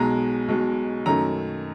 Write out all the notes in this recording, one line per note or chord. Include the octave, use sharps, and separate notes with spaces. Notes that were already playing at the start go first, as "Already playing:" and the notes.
Already playing: B1 B2 G#3 A#5
B1 B2 G#3
F#2 D#3 F#3 A3 A#5